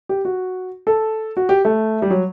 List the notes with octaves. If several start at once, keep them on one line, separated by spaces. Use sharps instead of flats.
G4
F#4
A4
F#4
G4
A3
G3
F#3